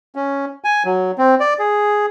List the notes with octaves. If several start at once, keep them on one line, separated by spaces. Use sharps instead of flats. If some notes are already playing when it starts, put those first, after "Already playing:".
C#4
G#5
F#3
C4
D5
G#4